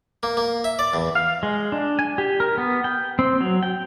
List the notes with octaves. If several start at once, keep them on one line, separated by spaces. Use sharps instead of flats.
A#3
A#3
E5
D5
E2
F5
G#3
D4
G#5
G4
A#4
B3
G5
C4
F#3
G5